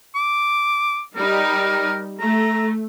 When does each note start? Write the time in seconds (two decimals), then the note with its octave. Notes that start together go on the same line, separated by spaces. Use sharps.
0.15 D6
1.16 G3 D#4 A#4
2.20 A3 A#5